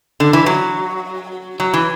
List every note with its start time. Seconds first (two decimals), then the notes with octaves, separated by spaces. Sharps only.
0.20 D3
0.33 E3
0.46 F#3
1.60 F#3
1.74 E3